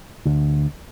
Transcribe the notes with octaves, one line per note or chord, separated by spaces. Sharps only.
D2 D3